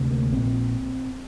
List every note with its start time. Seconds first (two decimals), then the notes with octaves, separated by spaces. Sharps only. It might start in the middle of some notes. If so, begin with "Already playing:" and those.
Already playing: D2 C3
0.10 A#3
0.32 A#1 A#2 C4